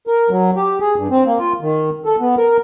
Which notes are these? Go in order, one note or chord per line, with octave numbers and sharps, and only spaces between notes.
A#4
F#3
G4
G#4
G2
C4
A#3
F4
D#3
A4
B3
A#4